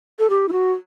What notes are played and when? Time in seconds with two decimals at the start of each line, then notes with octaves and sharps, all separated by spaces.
0.19 A4
0.30 G4
0.49 E4
0.52 F#4